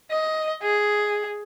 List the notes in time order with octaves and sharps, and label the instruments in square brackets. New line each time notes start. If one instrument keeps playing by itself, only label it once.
[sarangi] D#5
G#4